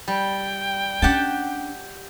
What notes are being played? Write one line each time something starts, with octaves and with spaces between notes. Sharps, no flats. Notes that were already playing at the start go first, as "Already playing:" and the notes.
G3 G5
C#4 D4 G4 F#5 A5